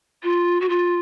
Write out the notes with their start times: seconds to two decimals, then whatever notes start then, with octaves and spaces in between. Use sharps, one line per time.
0.22 F4
0.60 F#4
0.68 F4